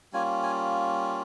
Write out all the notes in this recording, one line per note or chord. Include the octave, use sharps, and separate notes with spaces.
G3 A#3 C#4 F4 G#5
G#5